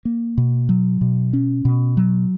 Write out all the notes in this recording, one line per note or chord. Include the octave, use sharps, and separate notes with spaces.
A#3
B2
F#3
B2
C#4
B2
F#3